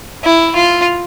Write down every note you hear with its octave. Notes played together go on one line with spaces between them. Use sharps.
E4
F4